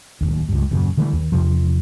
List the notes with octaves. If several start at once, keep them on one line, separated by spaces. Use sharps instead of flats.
D1 G#1 D#2
C#2 G2
D#1 F#2 C#3
D3 E3 G3 A3
D#2
E2 C3 F3